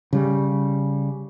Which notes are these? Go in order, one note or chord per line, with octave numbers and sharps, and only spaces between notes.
C#3 G3